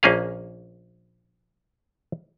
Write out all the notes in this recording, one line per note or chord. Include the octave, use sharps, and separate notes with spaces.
A#1 A#3 C#4 G#4 F5